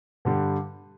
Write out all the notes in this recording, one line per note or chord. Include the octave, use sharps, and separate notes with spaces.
G2 D3 G3